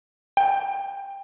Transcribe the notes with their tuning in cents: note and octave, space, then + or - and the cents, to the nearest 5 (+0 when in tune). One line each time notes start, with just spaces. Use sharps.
G5 +15